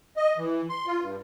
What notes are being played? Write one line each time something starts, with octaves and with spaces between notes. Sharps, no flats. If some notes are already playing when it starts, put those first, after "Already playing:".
D#5
E3
C6
F4
G2